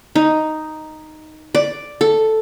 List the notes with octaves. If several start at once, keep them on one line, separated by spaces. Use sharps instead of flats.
D#4
D5
A4